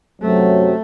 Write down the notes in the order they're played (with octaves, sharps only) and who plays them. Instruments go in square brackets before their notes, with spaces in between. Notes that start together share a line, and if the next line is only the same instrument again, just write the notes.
[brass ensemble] F#2 C3 F#3 [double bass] A3